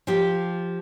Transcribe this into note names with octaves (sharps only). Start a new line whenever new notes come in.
F3 G4